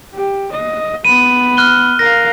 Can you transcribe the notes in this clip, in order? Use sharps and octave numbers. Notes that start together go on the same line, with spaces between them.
G4
D#5
B3 B5 D#7
F6 F#6 G7
A#4 F5 A#6